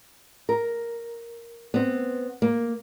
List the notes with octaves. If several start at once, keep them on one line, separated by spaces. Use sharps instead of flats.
A#4
B3 C4
A#3